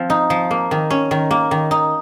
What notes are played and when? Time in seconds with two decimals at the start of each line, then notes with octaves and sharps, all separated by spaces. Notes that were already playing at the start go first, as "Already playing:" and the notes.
Already playing: F3 C4
0.10 D#4
0.30 F3
0.51 A#3
0.71 D#3
0.90 C#4
1.11 D#3
1.31 A#3
1.51 D#3
1.71 D#4